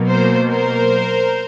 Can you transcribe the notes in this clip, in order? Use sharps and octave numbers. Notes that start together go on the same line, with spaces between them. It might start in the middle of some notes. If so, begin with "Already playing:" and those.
Already playing: B2 F#3 A#3
A#4 C5
A#4 C5